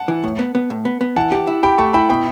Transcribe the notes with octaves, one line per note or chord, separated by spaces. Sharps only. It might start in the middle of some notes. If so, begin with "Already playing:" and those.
Already playing: F#5 A5
E3
A2
B3
B3
A2
B3
B3
E3 F#5 A5
G4
E4
G4 G5 B5
A3 A5 C#6
E4 G5 B5
B2 G5 B5